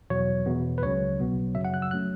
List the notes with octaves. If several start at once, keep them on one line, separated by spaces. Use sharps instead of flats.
E2 B2 F#3 C#5
E2 B2 B3
B4
C#2 C#3 F#3 C#4 C#5
B1 B2 F#3 B3
F#2 C#3 F#3 E5
F#5
F#6
E6
F#3 A3 C#4 F#6